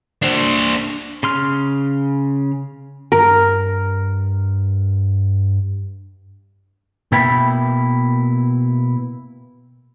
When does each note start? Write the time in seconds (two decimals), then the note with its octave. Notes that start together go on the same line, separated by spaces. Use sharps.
0.22 D4 C5
1.23 C#3 C6 F6
3.12 G2 A#4
7.12 B2 A#3 E4 E5 G5 B5